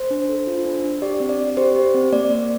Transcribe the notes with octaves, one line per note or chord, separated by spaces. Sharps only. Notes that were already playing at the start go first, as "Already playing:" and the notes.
Already playing: C5
D4
A4
F4
D4
D4
G4 D5
C4
D5
C4
G4 C5
G4
C4
A#3 D5
A#3